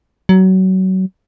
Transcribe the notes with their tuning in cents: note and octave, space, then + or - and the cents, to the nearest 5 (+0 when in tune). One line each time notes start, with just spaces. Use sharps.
F#3 +25